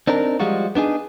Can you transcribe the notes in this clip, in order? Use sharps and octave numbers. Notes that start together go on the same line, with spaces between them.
C4 D4 D#4 A#4
F3 G3 G#3 F4 F#4
B3 D4 D#4 G#4